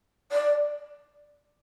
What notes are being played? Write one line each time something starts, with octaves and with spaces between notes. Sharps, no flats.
D5